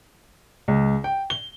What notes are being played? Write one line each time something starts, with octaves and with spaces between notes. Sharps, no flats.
C#2
G5
G7